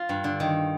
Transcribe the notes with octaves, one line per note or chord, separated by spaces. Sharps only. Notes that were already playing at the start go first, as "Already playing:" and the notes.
Already playing: F4
G2
D3
D#3